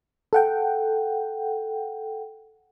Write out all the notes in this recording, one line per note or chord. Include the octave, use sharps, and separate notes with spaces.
A4 F#5 G5